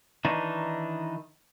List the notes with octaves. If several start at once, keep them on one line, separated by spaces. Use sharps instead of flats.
D#3 E3 D4 D#4